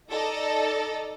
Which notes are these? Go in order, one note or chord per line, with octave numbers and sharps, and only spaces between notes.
D#4 A4 D5 D#5 A#5